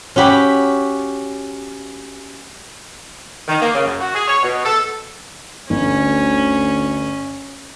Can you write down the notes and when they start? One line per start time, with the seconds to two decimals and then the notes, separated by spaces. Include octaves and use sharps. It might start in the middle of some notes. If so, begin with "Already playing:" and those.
0.16 C#4 F#4 G4 B5
3.48 D#3
3.61 A#3
3.74 C#3
3.86 F#2
4.01 F#4
4.15 G#4
4.28 C#5
4.43 B2
4.64 A4
5.70 G1 D2 C#4